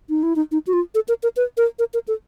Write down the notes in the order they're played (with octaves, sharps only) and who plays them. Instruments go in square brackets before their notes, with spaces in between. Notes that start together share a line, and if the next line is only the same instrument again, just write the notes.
[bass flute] D#4
E4
D#4
D#4
F#4
F4
A4
A#4
A#4
B4
A#4
A#4
A#4
A4